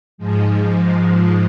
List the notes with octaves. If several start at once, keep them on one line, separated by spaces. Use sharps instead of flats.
G#2 F3 G#3